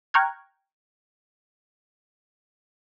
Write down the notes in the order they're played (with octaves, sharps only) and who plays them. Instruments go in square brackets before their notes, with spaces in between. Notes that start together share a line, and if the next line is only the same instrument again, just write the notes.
[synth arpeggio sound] G5 A#5 C#6 F6 F#6 G#6